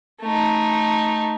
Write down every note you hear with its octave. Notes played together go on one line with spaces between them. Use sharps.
A3 D#4